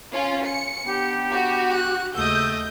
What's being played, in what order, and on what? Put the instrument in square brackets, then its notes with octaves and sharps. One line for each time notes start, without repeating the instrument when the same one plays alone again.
[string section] C#4 F4
C#7
[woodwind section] B3 D4 G4
[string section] F#4
[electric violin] F#6
[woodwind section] D#2 C#3 E6 [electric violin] A3 D#5 [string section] G6